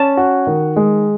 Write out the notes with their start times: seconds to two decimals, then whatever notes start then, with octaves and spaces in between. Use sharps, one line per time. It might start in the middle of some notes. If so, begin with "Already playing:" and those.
Already playing: C#4 A5
0.17 F#4
0.47 D#3
0.76 G#3